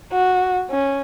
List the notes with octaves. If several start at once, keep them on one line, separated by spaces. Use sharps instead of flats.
F#4
C#4